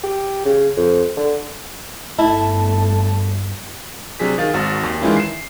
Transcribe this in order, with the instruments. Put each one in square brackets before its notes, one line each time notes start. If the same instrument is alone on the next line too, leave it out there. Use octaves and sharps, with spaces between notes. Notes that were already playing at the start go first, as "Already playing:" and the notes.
[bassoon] G4
C#3
F2
D3
[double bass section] G1 [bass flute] A3 [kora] E4 [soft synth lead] A5
[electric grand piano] C3 F#3 D4 G#4 B6
D#3 G#4 F5 A6
G#1 F#4 F6 A6
D#2
D#3 E3 G#3 C#4 E4 F4
C7 E7